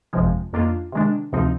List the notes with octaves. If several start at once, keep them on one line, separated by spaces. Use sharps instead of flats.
G1 F2 C3 F3 G#3
F2 D#3 A#3 D4 F4
C3 D#3 G#3 D4
D2 C3 F3 C4 D#4